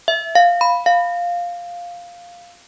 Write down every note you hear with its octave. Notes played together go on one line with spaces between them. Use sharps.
E5
F5
B5
F5